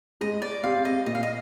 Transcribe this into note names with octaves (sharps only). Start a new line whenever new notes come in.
G#3 D#5
D5
C4 G4 F5
D#5
A#2 D#5
F5
D#5